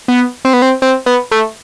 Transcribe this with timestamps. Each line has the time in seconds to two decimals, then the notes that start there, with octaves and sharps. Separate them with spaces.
0.08 B3
0.45 C4
0.54 B3
0.62 C4
0.82 C4
1.06 B3
1.31 A3